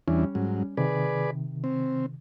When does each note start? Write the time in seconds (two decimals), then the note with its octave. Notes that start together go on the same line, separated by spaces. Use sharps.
0.08 E2 E3 G3 C#4 D4
0.35 G#2 F#3
0.77 C3 D#3 G#4 B4 D5
1.64 C4